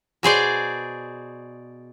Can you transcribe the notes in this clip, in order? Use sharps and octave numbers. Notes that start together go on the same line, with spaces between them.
B2 G#4 C5 D5